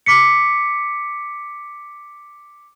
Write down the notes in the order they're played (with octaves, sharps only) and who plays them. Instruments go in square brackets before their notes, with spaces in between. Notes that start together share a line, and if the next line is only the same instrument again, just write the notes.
[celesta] D6 B6 C#7